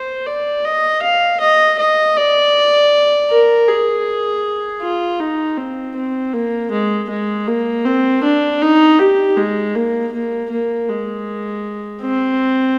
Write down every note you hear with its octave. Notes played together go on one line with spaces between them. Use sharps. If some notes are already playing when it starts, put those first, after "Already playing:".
Already playing: C5
D5
D#5
F5
D#5
D#5
D5
A#4
G#4
F4
D#4
C4
C4
A#3
G#3
G#3
A#3
C4
D4
D#4
G4
G#3
A#3
A#3
A#3
G#3
C4